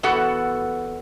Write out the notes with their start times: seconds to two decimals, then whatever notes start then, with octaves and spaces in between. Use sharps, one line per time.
0.03 E2 B3 F#4 A4 F#5